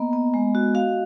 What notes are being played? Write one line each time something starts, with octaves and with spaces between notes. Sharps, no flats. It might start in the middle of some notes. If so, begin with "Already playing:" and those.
Already playing: A#3 B3 D#5
B3
G#3
F#4
F#4 F5